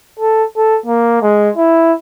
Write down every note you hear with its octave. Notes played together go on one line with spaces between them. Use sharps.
A4
A4
A#3
G#3
E4